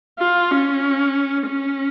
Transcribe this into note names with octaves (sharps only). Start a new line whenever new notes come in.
F4
C#4
C#4